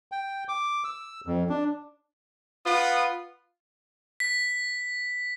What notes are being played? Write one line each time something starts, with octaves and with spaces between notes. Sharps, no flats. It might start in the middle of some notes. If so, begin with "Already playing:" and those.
G5
D6
E6
F2
D4
F4 B4 F#5 D#6
B6